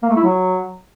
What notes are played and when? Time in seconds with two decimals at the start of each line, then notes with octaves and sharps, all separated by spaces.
0.03 A#3
0.09 A3
0.16 E4
0.23 F#3